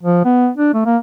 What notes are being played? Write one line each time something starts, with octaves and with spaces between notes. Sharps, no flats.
F3
B3
D4
A3
A#3